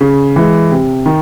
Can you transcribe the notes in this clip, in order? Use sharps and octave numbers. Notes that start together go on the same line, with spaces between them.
C#3
E3 G#3
C3
D#3